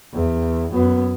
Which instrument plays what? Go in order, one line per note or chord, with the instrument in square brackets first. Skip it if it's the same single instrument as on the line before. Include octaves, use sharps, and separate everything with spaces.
[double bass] E2
F#2 B3